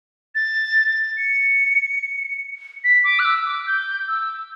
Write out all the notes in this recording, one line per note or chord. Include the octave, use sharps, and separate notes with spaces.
A6
C#7
B6
D6
F#6
E6
D6
G6
E6